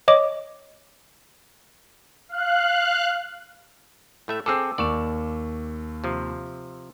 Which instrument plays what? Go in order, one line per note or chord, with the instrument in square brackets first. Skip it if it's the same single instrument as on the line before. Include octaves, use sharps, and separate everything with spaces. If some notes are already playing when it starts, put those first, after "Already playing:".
[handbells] C#5 D#5 D6
[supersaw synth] F5 F#6
[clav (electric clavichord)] A2 A3 E5
[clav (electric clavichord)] C4 G#4 A4 [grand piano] D6 E6
[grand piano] D#2 C#6 E7 [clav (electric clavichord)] D5
[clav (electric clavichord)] C3 F3